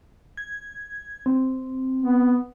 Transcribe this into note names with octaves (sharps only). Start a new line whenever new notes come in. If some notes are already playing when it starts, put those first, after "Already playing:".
G#6
C4
B3